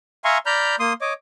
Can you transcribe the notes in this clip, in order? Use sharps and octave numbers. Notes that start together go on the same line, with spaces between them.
E5 F5 G#5 A#5 C6 C#6
D5 A#5 B5 F6 G6
A#3 C6 D#6
C#5 D#5 D6